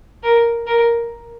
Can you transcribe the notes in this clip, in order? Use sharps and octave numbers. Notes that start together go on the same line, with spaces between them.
A#4
A#4